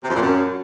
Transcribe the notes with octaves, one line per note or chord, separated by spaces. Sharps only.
C3
F2
A#2
F#2